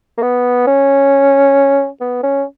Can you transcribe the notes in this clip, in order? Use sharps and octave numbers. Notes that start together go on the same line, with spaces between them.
A#3
B3
C#4
B3
C#4